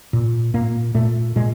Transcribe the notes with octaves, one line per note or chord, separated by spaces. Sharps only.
A#2
A#2 A#3
A#2 A3
A#2 G#3